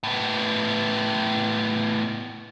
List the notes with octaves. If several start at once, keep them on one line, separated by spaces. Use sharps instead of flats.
A2 B3